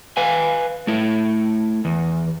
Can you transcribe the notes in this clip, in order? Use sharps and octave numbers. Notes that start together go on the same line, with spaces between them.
B4 F5 G#5
A3 E4
E2